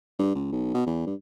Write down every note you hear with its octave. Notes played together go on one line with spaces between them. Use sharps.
G2
C#2
B1
B2
E2
G2